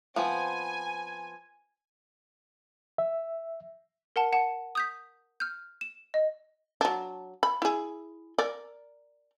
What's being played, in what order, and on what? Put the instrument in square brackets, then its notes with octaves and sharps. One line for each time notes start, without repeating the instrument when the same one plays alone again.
[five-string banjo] F3 B3 C4 [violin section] G#5
[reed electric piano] E5
[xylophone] A#4 F#5 A5
F#5 A5
D#6 G6 B6
F6 G6
E7
D#5
[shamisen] F#3 D4
B5
E4 G#4
A#4 D5